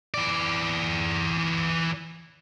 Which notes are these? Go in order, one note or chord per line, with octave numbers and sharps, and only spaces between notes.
E3 D5